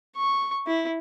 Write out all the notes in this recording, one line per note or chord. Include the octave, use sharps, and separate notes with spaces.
C#6
E4